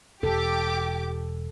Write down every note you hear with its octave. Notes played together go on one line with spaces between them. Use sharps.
E1 G4 A4 D6